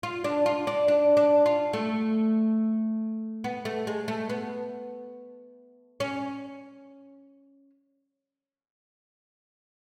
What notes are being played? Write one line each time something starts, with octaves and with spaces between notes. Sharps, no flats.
F4
D4
F4
D4
D4
D4
F4
A3
B3
A3
G#3
A3
B3
C#4